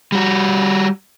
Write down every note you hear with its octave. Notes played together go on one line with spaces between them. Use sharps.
G3 F#4